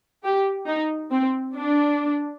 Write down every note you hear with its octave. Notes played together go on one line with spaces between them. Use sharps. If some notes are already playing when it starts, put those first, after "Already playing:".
G4
D#4
C4
D4